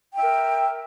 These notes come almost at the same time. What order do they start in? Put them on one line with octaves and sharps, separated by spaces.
G5 E5 A#4